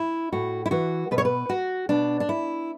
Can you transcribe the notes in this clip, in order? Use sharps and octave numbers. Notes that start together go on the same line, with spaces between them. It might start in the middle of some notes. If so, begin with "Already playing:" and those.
Already playing: E4
A2 F#4
E4
E3 F#4
B2 B4
C#5
B4
F#4
B2 D4
D4
E4